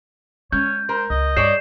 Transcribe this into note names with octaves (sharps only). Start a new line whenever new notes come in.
G#3 C#4 C#5 G6
A#4 C5
C#2 D#5
G2 G#4 C#5 D5 G6 C7 E7